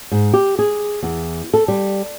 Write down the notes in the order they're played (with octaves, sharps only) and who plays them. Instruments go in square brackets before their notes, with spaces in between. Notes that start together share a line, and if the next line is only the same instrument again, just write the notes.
[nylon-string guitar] G#2
G4
G#4
E2
A4
G3